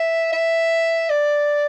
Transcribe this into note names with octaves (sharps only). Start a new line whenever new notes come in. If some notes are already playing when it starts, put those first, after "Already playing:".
Already playing: E5
E5
D5